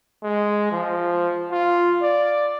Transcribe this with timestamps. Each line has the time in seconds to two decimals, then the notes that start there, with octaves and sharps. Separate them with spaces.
0.23 G#3
0.71 F3
1.51 F4
2.02 D5